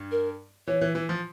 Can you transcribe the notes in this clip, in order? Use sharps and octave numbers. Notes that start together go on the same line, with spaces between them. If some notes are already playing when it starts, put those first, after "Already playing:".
Already playing: G2
A#4
E3 C#5
E3
E3
F3